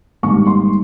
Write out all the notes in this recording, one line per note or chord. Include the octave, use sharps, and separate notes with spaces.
G#1 G#2 D#3 G3 A#3 C#6
C6